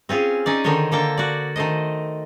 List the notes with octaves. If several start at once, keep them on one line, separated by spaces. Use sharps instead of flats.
C4 C#4 F4 G#4
C#4 D#4 D5
D3 D#3 D#4 C5 C#5
D3 A#3 A4 G5
F#4 D5
D#3 A3 C5 D#5